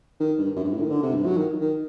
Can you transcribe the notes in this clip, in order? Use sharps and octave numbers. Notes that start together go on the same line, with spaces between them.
D#3
G2
F#2
G2
A2
D#3
D3
C3
G2
F#3
D#3
D#3